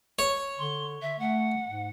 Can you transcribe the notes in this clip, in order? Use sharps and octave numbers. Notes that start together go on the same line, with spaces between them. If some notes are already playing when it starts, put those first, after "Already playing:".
C#5
D3 C6
E5
A3 F#5
G#2